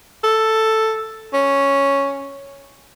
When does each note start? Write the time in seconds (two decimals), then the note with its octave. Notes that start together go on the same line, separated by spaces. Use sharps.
0.24 A4
1.34 C#4